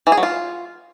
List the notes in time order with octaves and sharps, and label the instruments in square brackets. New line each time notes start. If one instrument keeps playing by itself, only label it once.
[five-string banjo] E3
G#4
F#3
F4